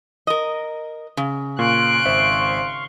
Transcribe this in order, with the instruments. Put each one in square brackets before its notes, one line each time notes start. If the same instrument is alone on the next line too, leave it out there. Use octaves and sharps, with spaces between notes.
[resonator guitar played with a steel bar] A#4 D#5
C#3
[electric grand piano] A#2 [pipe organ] F5 C6 C#6 [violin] F#6 D7
[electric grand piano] G#1 C5 E5